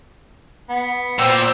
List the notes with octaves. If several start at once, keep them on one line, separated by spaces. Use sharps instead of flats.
B3
A#2 C5 G5 E6